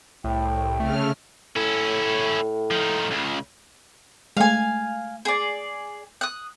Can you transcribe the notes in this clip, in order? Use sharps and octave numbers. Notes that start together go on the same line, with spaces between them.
C2 A2 G5
C#3 A3 F6
A2 C#4 E4
F3 D#4
C#2 C#3
G#3 A3 F5 G#5
G#4 D5
D#6 F#6